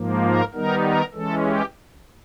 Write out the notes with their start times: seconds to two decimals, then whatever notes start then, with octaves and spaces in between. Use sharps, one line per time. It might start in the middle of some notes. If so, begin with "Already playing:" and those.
Already playing: G#2 F3 A#3
0.23 A#4
0.53 D#3 G3 B3 D#4 A#4
0.84 A#4
1.14 E3 G#3 C#4 A4
1.44 G4